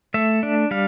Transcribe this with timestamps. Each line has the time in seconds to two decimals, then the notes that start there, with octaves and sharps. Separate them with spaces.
0.14 A3 E5
0.43 D4
0.71 G3 F5